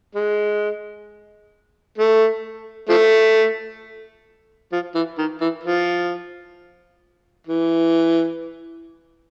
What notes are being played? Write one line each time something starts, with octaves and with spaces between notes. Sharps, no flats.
G#3
A3
F3 A3
F3
E3
D#3
E3
F3
E3